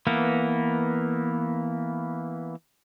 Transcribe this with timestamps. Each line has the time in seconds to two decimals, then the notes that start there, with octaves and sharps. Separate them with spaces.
0.07 E3 A#3 B3